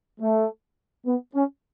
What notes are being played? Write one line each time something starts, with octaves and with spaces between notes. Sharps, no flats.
A3
B3
C#4